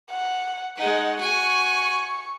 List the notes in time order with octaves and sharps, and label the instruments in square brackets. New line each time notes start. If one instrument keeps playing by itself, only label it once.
[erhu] F#5
[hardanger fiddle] G#3 D#4 [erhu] F#5
[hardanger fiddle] F#4 G#5 [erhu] C#6